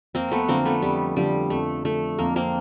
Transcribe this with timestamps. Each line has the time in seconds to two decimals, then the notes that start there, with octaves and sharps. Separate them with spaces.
0.14 F2 A#3 C4
0.32 A3 B3
0.48 D3 F3 A#3 C4
0.65 A3 B3
0.82 F2 G3
1.16 D3 F3 G3
1.50 F2 A3
1.85 D3 F3 A3
2.19 F2 A#3
2.36 A#3 C4